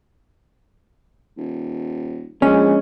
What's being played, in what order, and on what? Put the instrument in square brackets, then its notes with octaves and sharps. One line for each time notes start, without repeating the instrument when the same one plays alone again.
[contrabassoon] D#1
[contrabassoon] A#1 [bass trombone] G#3 [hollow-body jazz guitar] C#4